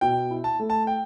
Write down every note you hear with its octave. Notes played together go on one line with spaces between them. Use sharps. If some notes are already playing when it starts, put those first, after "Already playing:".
B2 G5
E4
A5
A3
A5
G5